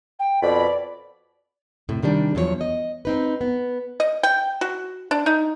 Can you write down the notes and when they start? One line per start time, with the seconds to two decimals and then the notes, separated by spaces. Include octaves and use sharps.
0.19 G5
0.43 F2 B2 D5 B5
1.89 A2 C3
2.02 C3 D#3 G3 D4
2.35 E2 F3 F#3 A#4 C#5
2.61 D#5
3.05 C4 D#4 B4
3.41 B3
4.00 D#5
4.23 G5
4.61 F#4
5.11 D4
5.26 D#4